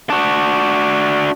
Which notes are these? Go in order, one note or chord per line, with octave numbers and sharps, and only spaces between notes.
D4 F#4